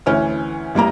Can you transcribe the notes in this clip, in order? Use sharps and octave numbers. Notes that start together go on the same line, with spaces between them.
D2 E3 C#4 E4 F6
A1 G3 A#3 A#5